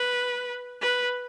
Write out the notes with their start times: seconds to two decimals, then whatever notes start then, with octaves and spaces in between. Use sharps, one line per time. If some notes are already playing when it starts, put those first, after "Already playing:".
Already playing: B4
0.81 B4